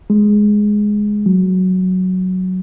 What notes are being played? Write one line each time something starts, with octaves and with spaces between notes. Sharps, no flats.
G#3
F#3